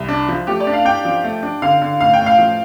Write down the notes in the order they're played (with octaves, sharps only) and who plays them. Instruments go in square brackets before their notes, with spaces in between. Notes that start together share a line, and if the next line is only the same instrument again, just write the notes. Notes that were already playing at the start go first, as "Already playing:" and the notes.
Already playing: [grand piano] C2
D4
F3
[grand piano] A3 [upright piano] G4
[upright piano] D5
[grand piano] D4
[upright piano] F5
[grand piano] D4 [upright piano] G5
[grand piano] F3
A3
D4
[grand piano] D3 [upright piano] F5
[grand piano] D3
[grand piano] A2 [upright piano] F5
[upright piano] G5
[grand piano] A2
[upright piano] F5
[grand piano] F3